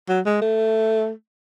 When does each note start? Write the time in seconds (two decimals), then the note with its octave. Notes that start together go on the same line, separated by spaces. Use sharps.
0.09 F#3
0.25 G#3
0.41 A3